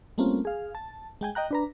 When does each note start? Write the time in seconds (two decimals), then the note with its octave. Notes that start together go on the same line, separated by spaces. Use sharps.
0.18 G3 A3 A#3 C4 C#4 F4
0.45 G#4 F5
0.75 A5
1.21 G#3 G5 G#5
1.35 D#5 G5 A#5 F#6
1.51 D4 B4 A#5